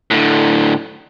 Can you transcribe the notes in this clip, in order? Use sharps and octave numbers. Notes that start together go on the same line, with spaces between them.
A2 D3